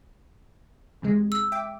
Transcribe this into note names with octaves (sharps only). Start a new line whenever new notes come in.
E2 C3 G#3
E6
E5 G5 D6